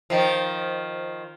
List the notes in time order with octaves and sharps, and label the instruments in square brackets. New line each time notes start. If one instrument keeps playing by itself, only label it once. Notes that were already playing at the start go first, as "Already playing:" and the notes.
[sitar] D#3 F3